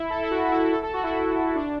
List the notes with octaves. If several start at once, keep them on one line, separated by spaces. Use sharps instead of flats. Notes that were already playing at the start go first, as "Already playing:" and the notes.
Already playing: E4
A4
E4
F#4
F#4
E4
A4
A4
F#4
E4
D4